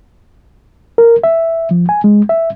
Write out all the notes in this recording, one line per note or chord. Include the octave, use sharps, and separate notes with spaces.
A#4
E5
F3
G#5
G#3
E5